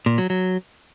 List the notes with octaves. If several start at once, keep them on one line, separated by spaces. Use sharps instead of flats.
A#2
F#3
F#3